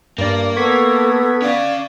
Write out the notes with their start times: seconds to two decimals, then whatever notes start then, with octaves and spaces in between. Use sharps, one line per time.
0.18 G2 A#3 D5
0.56 B3 A4 C#6 G#6 B6
1.42 C#4 D5 F5